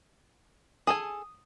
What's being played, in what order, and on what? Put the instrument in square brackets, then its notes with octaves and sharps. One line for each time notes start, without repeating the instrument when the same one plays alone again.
[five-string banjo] G#4 A4 G#5 [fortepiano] D#6